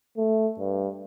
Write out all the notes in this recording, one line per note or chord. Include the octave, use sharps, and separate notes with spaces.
A3
G2